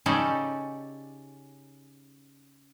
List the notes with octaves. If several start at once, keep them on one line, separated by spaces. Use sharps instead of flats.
C#3 C#4 D#4 G4 A4 D5